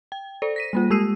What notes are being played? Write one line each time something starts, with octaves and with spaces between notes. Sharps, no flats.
G5
A4 C5 D5
A#6 B6 D#7
G3 A#3 F4
G#3 G4 D#6 E6 C7 D#7